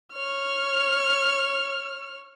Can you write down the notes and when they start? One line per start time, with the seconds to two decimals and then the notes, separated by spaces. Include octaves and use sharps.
0.13 C#5 F6